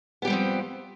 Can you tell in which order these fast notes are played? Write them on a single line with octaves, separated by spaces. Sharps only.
B3 G4 G3 C4 F3